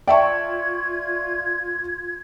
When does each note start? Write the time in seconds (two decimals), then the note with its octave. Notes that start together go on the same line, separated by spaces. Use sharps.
0.07 F4 D5 E5 G5 A5 C#6 G#6